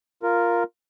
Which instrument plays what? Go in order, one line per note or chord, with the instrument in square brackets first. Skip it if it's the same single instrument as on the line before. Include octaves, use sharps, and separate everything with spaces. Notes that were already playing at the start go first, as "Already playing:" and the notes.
[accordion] F4 A#4